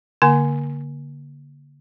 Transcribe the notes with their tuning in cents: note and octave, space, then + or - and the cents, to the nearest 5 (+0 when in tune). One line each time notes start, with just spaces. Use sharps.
D3 -35 A#3 +5 G#5 +0